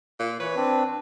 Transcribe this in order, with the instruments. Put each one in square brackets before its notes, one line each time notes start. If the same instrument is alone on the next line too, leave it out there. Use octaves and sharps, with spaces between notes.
[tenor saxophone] A#2
[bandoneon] E3 C#5 [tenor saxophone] B4
[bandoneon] C4 D4